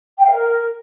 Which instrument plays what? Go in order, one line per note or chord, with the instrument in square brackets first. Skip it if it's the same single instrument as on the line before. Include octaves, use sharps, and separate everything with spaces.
[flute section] G5
F5
A#4